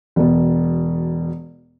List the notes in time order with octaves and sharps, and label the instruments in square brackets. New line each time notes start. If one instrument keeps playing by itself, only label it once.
[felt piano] E1 B2